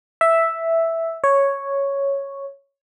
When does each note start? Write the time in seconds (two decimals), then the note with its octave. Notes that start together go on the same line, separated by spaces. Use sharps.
0.21 E5
1.24 C#5